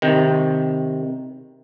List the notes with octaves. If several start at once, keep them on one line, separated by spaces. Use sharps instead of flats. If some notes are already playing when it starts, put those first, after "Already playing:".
C3 D#3